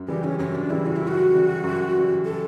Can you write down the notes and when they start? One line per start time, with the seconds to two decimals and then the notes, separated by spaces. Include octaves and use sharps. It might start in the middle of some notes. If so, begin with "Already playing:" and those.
Already playing: F#2
0.08 C#3 E3 G3 G4
0.24 C#4
0.39 F#2 C#4
0.55 D4
0.70 C#3 E3 G3 E4
0.86 F#4
0.96 F#2 E4
1.08 F#4
1.32 C#3 E3 G3
1.64 F#2
1.94 C#3 E3 G3
2.25 A4